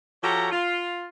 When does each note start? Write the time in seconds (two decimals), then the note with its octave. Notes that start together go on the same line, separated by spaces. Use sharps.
0.23 F3 F#4 G4 A4 C#5 A#5
0.52 F4